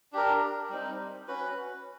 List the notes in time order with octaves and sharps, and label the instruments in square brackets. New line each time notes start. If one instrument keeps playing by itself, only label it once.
[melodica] D4 G4 A#4
G3 C4 D#4
C#4 F#4 B4